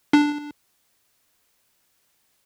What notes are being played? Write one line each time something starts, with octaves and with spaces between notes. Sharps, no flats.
D4